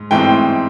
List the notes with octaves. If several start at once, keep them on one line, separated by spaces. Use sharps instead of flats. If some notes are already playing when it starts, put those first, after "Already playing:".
Already playing: G#2
G#2 E3 A3 C4 G5